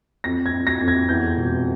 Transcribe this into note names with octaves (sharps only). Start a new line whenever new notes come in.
F2 A#6
G#6
F2
A#6
F2
G#6
E2 G6
E1